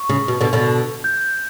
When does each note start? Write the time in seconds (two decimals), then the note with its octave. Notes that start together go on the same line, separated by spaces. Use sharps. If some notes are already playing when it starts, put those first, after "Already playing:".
Already playing: C#6
0.09 C#3
0.28 B2
0.41 B2 D3
0.53 B2 D3
1.04 G6